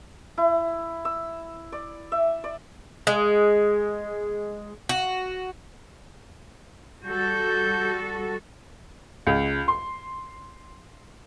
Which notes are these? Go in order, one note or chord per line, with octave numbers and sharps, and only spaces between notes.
E4
E6
D5
E5
D5
G#3
F#4
G3 F#4 A4 G6
C#2
C6